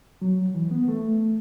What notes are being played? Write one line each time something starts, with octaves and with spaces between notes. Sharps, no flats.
F#3
E3
B3
A3